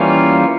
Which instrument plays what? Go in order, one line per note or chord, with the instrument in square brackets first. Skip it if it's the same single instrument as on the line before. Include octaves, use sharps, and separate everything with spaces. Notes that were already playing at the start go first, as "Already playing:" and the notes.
Already playing: [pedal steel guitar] E3 G3 A#3 C#4 F4